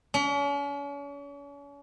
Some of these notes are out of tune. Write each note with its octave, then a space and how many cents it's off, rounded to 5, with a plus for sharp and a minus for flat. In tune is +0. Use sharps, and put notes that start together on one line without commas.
C#4 +40